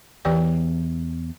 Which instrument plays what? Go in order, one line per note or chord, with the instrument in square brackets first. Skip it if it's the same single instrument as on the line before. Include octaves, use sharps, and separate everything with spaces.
[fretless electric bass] E2 [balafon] E3 B3 G4 B4 D5